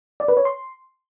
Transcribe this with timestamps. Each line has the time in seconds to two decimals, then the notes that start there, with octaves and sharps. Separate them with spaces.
0.20 D5
0.28 B4
0.37 C#5
0.45 C6